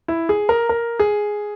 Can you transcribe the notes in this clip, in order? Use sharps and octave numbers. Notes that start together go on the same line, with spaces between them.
E4
G#4
A#4
A#4
G#4